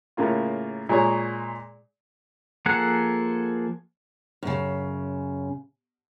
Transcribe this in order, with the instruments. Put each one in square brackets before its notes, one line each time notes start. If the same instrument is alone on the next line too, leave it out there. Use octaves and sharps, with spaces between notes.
[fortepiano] A2 C#3 A#3 F4
A#2 G#3 G#4 C#5 A#5
[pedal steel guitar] F3 A#3 G#4 A4 F#5
[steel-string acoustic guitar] F#2 C#3